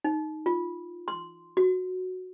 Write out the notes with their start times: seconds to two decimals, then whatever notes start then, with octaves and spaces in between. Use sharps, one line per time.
0.04 D#4
0.46 F4
1.08 C6
1.57 F#4